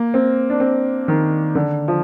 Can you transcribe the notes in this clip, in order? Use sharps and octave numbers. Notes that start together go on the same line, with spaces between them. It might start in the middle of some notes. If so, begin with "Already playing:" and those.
Already playing: A#3
C4
D4
C4
D#3
D3
F3